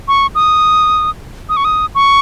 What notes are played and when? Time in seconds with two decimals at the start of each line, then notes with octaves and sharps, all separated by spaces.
0.08 C#6
0.35 D#6
1.49 D#6
1.57 C#6
1.65 D#6
1.95 C#6